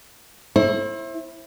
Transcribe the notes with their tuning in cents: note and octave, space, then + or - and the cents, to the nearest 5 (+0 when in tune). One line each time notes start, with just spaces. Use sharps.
E4 +0 C5 +45